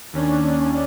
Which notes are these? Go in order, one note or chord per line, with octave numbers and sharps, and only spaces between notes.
D#2 C#4 D4